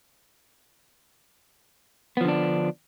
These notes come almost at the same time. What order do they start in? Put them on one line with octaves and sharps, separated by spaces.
B3 F3 D3 D4